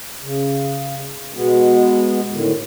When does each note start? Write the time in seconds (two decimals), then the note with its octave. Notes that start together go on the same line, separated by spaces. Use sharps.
0.23 C#3
1.34 B2 G#3 B3
2.32 A2 D3 D#3